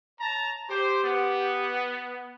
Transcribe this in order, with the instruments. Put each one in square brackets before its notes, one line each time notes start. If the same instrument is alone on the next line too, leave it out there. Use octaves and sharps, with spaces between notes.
[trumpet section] C#5 A5 A#5
[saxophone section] G4 [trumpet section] C5
[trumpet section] B3